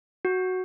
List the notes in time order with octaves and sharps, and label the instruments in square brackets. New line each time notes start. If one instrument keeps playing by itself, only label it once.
[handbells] F#4